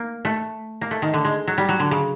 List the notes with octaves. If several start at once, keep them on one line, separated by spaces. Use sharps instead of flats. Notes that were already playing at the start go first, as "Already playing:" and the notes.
Already playing: A#3
A3
A#3
A3
D#3
D3
G#3
F#3
G3
F#3
D3
C#3